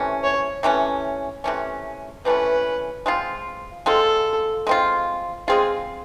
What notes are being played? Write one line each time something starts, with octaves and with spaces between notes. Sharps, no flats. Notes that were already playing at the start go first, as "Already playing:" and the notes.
Already playing: C3 E3 A3 C#4
C#5
C3 E3 A3 C#4
C3 E3 A3 C#4
C3 E3 A3 C#4 B4
G#3 C4 F4
G#3 C4 F4 A4
G#3 C4 F4
G#3 C4 F4 G#4